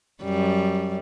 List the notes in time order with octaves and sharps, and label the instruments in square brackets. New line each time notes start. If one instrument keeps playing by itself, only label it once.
[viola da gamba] F#2 G3